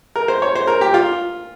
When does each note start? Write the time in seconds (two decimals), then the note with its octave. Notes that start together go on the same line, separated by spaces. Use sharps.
0.16 A#4
0.28 C5
0.42 C#5
0.55 C5
0.67 A#4
0.81 G4
0.94 F4